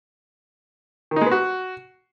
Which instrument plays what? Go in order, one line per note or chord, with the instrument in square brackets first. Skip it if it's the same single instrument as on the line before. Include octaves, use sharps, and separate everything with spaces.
[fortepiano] D#3
D#4
G#3
B3
F#4